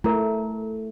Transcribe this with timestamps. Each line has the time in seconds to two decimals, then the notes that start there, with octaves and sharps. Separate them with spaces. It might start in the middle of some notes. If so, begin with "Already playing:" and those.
0.04 A3 E4 A#4